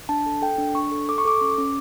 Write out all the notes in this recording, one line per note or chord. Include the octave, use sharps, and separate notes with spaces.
D4 A5
A4
A4 G5
D4
D4 C#6
A4
A4 D6
C#6
A4 D6
C#4
C#4